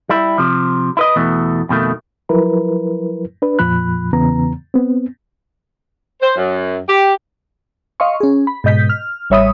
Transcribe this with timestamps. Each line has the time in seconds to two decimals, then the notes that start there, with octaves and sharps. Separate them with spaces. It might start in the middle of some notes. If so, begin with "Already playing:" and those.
0.09 G3 E4
0.38 C3 F3
0.97 E4 B4 D#5
1.16 E2 B2 E3 A3
1.69 F2 B2 D#3 A3
2.29 F3 F#3 E4 A#4 B4
3.42 D4 B4
3.59 F2 A#2 F3 B5 F#6
4.13 E2 C#3 E3 B3 A#5
4.74 B3 C4
6.22 C5
6.36 F#2
6.89 G4
8.00 D#5 F5 C6 C#6
8.20 C#4 G#4
8.47 B5
8.64 G#2 B2 D#5 G6 B6
8.89 F6
9.30 A1 G3 C#5 E5 B5 D#6